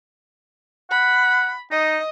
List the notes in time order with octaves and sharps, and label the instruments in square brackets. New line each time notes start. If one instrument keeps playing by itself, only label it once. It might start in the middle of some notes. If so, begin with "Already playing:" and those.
[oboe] F#5 [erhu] B5
[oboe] D#4 [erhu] D#5